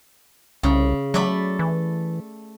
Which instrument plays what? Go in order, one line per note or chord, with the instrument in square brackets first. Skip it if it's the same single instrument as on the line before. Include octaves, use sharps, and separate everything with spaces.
[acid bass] C2 [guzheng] C#3
[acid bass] F#3 [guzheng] A3 D5 B5
[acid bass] E3